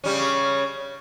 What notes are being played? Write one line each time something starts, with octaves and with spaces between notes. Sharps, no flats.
C#3 G3 C#4